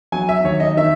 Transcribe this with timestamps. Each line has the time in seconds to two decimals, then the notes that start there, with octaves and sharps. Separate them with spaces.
0.12 F#3 G#5
0.29 E5
0.44 D#2 C#5
0.60 D#5
0.77 D#3 E5